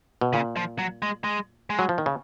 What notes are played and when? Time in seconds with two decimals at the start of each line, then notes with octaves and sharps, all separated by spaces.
0.21 B2
0.33 A#2 C#3
0.56 F3
0.79 F#3
1.02 G#3
1.24 G#3
1.70 G#3
1.79 F#3
1.89 F3
1.98 D#3
2.06 C#3